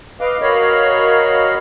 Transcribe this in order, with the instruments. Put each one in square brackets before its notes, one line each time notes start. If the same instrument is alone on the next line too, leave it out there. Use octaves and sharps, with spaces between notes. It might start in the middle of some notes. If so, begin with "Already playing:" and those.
[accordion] B4 D#5 F5 D6
F#4 A#4 C#5 D#5 F5 B5